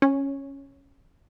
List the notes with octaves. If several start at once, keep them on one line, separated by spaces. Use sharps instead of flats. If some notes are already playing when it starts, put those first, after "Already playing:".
C#4